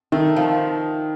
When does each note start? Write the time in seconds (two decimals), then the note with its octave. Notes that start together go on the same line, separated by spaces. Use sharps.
0.12 D#3 A3
0.36 F3